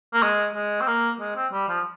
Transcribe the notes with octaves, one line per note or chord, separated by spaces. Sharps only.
A#3
G#3
G#3
C4
A#3
G#3
C4
G3
F3